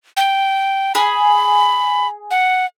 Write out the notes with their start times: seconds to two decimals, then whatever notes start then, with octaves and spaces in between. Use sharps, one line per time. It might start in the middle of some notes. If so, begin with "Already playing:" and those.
0.17 G5
0.95 G#4 B5
2.31 F#5